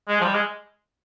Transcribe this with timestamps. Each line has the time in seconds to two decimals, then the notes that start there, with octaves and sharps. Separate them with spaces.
0.08 G#3
0.20 F3
0.24 G3
0.34 G#3